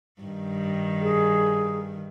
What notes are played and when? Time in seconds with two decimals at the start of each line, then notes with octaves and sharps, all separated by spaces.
0.22 G2 D#3
1.01 G#4